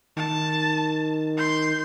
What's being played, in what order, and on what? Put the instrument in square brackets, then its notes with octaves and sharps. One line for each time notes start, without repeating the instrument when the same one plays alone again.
[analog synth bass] D#3 [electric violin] A5
[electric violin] C6 G6